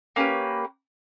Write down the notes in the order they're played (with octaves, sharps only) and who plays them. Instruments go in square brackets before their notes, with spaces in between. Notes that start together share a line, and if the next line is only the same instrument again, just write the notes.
[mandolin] A#3 C#4 G4 B4